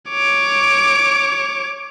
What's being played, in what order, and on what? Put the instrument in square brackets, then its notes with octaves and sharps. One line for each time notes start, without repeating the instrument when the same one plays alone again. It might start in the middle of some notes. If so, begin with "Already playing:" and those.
[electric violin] C#5 D6